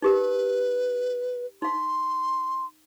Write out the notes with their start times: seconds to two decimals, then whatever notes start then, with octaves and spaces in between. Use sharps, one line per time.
0.02 D#4 G4 A#4 B4
1.62 D#4 F5 C6